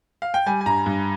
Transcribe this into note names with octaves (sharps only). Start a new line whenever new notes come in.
F5
G5
G3 G#5
G#5
G2 A#5
G2